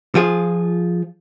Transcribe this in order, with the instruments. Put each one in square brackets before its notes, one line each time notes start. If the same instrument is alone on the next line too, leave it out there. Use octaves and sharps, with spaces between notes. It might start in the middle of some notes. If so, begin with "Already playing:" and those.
[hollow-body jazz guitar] F3 F4 G#4